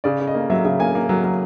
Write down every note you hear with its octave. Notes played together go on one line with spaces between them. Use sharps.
C#3 D5
C#3
D#5
A#3
F#3 E5
C#3 E5
A#3 G#5
A#3
F#3
F#3